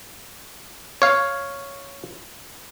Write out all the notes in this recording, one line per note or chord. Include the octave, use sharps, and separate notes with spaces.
C#5 F5